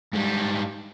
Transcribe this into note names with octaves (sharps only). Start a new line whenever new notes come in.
G#2 G3